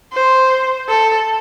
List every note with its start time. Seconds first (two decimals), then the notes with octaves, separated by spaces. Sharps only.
0.13 C5
0.88 A4